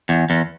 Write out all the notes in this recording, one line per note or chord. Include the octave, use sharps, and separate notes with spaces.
E2
E2